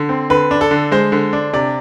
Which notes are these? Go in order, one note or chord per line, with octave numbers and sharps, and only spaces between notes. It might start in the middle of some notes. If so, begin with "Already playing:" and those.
Already playing: D3
C4
D3 B4
D4
A4
D3
G#3 C5
D3
D4
C3 D5